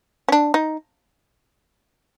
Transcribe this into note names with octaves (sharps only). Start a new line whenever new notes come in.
C#4
D4
D#4